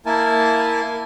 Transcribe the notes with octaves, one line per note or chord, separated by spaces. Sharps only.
A#3 E4 A#4 G#5 A5